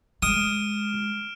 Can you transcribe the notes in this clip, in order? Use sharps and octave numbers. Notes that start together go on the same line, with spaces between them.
G#3 D#6 F6 D7 E7